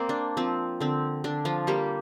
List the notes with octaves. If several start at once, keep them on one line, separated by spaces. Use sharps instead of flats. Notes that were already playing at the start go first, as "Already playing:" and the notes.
Already playing: A#3 C4 C5 D5
D4
F3 C4
D3 C4
D3 D4
F3 F4
G3 A#3 G4